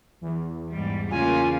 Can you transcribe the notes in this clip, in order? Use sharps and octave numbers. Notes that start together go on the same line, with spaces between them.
E2
G#2 G3
C#3 A#3 F4 G#5